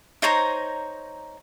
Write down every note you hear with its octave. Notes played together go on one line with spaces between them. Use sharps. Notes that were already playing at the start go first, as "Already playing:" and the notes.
D#4 C5 C#5 A#5